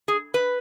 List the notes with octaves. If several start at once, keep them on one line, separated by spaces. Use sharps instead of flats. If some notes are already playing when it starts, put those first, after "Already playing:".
G#4
B4